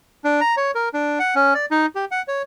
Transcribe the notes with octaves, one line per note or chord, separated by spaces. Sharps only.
D4
A#5
C#5
A#4
D4
F#5
C#4
D5
D#4
G4
F#5
C#5